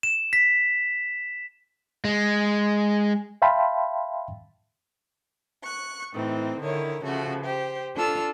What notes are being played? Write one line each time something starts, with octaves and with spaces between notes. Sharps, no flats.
E7
B6
G#3
E5 F5 G5 A5 B5 C6
C#6 F#6
A2 E3 C4 D#4
D3 D#3 E4 C#5
C#3 F3 A3 F#4
G4 C5
D4 F4 A4 A5 E6 F6